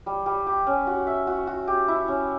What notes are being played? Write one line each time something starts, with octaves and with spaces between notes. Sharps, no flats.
G3
G3
G4
C#4
F#4
E5
F#4
F#4
G4
E4
C#4